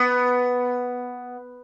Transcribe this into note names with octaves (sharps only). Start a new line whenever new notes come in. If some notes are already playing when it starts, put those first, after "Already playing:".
Already playing: B3